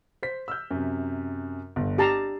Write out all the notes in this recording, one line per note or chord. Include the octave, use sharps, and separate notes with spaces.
C5 B6
E6 F6 G6
F#2 C3
G1 G2
D4 G4 A5 A#5 C7